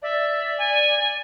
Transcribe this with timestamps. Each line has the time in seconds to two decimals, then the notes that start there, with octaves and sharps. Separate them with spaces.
0.02 D5 E5
0.58 G#5